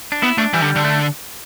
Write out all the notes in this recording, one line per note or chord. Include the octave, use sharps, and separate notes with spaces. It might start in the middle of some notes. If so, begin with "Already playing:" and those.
D4
B3 E4
A3 D4
E3 G3
D3
D3
A3